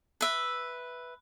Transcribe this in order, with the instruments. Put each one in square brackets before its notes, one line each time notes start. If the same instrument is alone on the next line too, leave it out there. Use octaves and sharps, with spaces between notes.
[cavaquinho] B4 E5